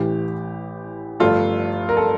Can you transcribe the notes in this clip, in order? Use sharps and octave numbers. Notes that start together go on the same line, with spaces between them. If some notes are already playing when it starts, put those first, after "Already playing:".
Already playing: A1 A2 E3 G4
G1 G2 F3 A3 F4 A4
A#4
A4